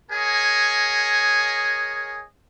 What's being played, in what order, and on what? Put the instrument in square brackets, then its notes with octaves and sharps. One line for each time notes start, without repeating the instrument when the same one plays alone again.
[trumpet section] G#4 A#4 C#5 D#5 G#5